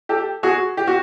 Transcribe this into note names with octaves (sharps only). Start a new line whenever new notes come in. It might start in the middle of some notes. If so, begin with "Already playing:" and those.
G4 A4
F#4 G#4
G4
F#4